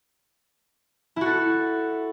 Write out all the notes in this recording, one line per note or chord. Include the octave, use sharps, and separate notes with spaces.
E4 F#4 A4